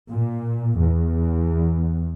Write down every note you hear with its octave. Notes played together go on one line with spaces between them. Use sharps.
A#2
E2